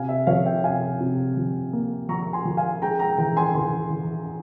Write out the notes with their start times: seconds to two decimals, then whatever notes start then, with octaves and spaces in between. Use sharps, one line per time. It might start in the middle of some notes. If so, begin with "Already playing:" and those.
Already playing: C3 F5 G#5
0.09 E5
0.27 F3 C#5 F5
0.46 E5 G5
0.64 C3 F5 G#5
1.00 C3
1.37 F3
1.73 A#3
2.08 F3 A#5 C#6
2.33 G#5 C6
2.45 F3
2.57 F5 G#5
2.82 G#3 G5 A#5
2.99 G5 A#5
3.18 E3 G5 A#5
3.37 G#5 C6
3.55 E3 G#5 C6
3.90 E3